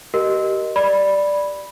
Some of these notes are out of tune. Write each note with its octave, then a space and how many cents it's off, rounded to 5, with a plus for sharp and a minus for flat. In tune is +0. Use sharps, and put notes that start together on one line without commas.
G4 -30 A#4 +0 D#5 -5
D5 +0 B5 -5